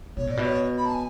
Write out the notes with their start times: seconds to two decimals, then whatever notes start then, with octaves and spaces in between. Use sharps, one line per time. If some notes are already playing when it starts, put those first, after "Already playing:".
0.17 B2 C#5
0.27 A2 D5
0.37 B2
0.45 C#5
0.77 B5
0.86 A5
0.94 G#5